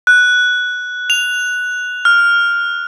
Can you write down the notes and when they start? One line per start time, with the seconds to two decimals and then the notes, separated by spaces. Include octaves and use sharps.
0.07 F#6
1.10 F7
2.05 F6